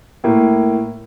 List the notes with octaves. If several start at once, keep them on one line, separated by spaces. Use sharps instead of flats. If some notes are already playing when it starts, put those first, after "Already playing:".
A2 A#3